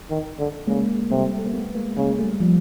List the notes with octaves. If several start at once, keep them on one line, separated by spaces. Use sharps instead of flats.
D#3
D3
C#3 G#3 A#3
C3 G3 A3
A3
A#3
A3 B3
G#3 A#3
C#3 G#3 A#3
G3 A3
F3 G3